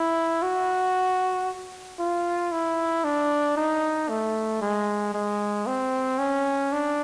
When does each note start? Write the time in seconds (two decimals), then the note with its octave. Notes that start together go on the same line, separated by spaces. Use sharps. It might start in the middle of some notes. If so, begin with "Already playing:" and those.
Already playing: E4
0.42 F#4
1.99 F4
2.52 E4
3.04 D4
3.57 D#4
4.09 A3
4.62 G#3
5.14 G#3
5.67 C4
6.19 C#4
6.72 D4